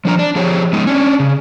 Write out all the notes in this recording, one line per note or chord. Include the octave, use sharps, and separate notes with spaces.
F3 D4 A#5
D4
F3 G4 G#4 C#5
G#3 B3 D#4
C#4 D4
C#3